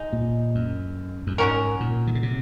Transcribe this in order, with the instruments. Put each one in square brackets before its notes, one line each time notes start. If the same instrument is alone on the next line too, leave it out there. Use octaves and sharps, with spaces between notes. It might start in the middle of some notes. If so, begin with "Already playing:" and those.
Already playing: [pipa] G#3 D#4
[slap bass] A#2
F#2
F#2
[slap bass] G#2 [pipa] F#3 C#4 F#4 A#4
[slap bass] A#2
D#3
C#3
C3